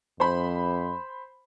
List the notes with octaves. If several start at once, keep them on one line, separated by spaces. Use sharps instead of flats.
F2 C5 B5